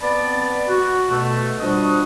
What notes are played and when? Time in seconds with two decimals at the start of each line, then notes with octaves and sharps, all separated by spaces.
0.01 B3 C4 D5 A5 B5 D6
0.67 F#4
1.11 B2 A3
1.60 F3 G3 D4 F#4 D#5